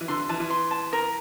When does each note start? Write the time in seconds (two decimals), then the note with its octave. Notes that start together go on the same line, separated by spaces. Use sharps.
0.01 E3
0.08 D3 C6
0.19 D3
0.29 E3 A5
0.40 E3
0.50 C6
0.71 A5
0.93 A#4